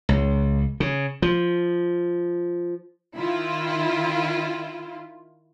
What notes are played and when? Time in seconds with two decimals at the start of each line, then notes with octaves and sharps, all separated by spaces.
0.09 C#2
0.80 C#3
1.22 F3
3.15 D#3 E4 F4